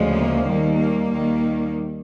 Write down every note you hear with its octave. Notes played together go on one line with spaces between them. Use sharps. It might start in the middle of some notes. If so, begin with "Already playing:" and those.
Already playing: D2 C#3 F3 G#3
A#3
D#2 D#3 G3
A#3
D#2 D#3 G3